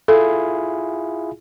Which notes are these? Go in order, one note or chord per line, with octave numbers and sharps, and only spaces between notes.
E4 F4 G#4 A4